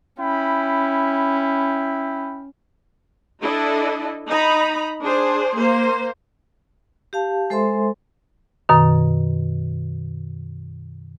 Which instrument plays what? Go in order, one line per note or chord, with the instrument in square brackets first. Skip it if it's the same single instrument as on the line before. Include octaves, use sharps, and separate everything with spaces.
[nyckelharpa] C#4 [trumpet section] E4 G5 B5
[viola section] D4 E4 A4 D#5
D#4 A#5 B5
D4 G#4 C5
A#3 C5
[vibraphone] G4 F5 A5
G#3 A4 C5 E5 G#5 C6
[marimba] F#2 B2 D#3